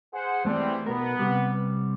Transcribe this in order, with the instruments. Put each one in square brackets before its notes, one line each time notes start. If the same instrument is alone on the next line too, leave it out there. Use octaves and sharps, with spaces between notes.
[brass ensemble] G#4 C5 F#5
[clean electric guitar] E2 A3 [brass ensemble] E3 G3 C4
[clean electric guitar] B1 A#4 [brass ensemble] B3
[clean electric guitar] C3 G3